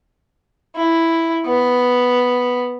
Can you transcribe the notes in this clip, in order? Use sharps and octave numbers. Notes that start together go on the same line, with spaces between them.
E4
B3